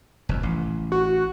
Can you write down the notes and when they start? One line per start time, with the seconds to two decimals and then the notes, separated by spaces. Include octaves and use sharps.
0.29 F1 F2
0.43 A1
0.92 F#4